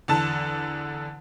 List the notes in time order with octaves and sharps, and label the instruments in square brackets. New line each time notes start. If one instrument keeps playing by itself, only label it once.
[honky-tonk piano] E2 D3 A5